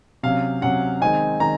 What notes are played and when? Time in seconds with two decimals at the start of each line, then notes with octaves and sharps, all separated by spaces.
0.23 C3 F#3 C#4 F5
0.61 C3 F#3 C#4 F#5
1.01 D#3 G#3 C4 D#4 G#5
1.40 D#3 G#3 A#5